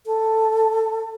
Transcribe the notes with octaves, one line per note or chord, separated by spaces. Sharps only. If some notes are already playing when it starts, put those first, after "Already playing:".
A4